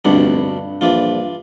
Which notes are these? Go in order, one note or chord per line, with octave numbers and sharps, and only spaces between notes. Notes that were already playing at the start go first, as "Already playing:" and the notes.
F1 D2 G2 B2 D4
A#1 E3 D4 F4